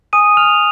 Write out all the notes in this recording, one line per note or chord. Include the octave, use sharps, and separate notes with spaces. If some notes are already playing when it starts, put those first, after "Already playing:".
G#5 D#6 D#7
F6 F7